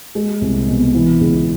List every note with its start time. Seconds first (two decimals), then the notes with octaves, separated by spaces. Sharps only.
0.15 G#3
0.41 C2
0.68 B2
0.94 E3
1.21 C#2